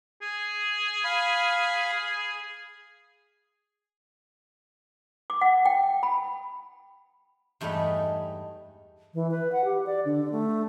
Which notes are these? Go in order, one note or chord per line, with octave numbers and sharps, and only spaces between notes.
G#4
F5 B5
D6
F#5
G5
B5
E2 G2 G#3 A3 D#4
E3
B4
F#5
G4
D5
D3
A3